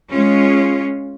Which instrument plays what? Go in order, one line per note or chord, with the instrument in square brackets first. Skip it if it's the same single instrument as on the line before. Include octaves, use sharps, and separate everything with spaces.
[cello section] G#3 C#4 F4